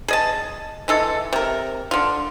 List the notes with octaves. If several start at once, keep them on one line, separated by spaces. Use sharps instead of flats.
G#4 D#5 A5
E3 G#3 A4
C3 A#4
D3 F4